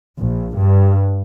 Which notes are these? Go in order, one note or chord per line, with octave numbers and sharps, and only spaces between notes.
A#1
G2